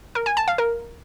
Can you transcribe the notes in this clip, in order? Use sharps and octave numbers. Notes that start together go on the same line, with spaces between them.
A#4
G#5
A5
F5
A#4